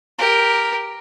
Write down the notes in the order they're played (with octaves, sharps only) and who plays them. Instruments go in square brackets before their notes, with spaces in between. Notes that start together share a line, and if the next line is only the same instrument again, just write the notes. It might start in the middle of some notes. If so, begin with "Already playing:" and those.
[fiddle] G4 A#4